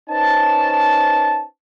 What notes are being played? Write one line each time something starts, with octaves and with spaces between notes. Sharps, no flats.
C#4 D#4 B4 C5 A5